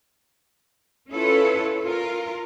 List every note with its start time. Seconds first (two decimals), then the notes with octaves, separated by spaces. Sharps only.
1.10 C#4 E4 F4 A4 B4 C#5
1.85 F4 A#4